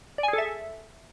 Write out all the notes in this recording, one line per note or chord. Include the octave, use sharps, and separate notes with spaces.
D5
G#5
G#4
A4
E5